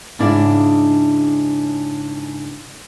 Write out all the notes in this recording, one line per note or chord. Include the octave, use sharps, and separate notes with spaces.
G#2 C#3 D4 E4 D5